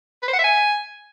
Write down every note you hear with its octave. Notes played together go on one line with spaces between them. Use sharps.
B4
C5
F#5
E5
G#5